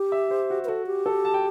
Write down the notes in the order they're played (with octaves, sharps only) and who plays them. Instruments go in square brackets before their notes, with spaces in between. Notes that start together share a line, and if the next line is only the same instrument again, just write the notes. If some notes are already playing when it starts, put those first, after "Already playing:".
Already playing: [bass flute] G4
[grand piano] E5
C5
F#4
[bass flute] B4
[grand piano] F#4 [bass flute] A4
[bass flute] G4
[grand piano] A4
A5
G5